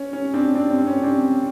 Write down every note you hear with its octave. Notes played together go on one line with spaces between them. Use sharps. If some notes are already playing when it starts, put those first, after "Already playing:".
Already playing: C#4
C#4
C4 D4
C4 D4
C4
C#4
C4 D4